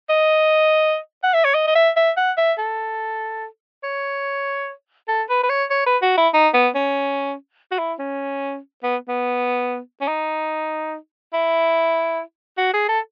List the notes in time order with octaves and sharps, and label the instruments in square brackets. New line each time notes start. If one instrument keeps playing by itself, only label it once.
[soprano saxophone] D#5
F#5
E5
C#5
D#5
D#5
E5
E5
F#5
E5
A4
C#5
A4
B4
B4
C#5
C#5
B4
F#4
E4
D#4
B3
C#4
F#4
E4
C#4
B3
B3
C#4
D#4
E4
F#4
G#4
A4